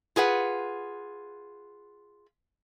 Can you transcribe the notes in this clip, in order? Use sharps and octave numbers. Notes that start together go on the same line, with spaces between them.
F4 G#4 B4 F#5